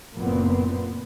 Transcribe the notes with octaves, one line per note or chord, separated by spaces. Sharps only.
F#1 A#2 B3 C4